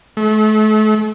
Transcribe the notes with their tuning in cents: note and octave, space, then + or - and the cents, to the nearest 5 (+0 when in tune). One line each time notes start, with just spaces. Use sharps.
A3 -35